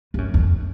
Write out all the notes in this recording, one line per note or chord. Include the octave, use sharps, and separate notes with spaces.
G2
F#2
F2